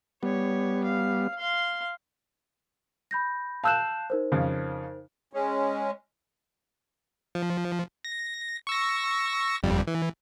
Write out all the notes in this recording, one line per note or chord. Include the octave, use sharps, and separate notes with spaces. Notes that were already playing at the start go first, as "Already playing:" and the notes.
G3 B3 C#5
F5
F5 C6
B5 G6 A#6
F5 A5 E6 F#6 G6 E7
D#4 A#4 C5
F2 C#3
G#3 C#4
F3
A#6
C#6 E6 A#6
G1 F2 G3
E3